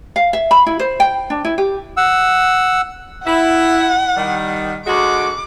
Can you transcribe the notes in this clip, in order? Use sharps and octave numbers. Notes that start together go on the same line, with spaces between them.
F5
E5
B5
E4
C5
G5
D4
E4
G4
F#5 E6
E4 F#5
D#3 G3
D2 G#3 F#4 D6